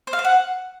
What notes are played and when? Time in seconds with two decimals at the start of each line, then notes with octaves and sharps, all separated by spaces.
0.07 C5
0.13 F5
0.19 C5
0.25 F#5